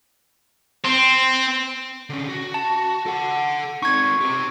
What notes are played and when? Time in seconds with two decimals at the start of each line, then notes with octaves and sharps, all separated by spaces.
0.84 C4
2.10 D3 C#4
2.29 F#4
2.54 A5
3.06 A4 F#5
3.83 C4 D#4 C#6 G#6
4.21 G4 C5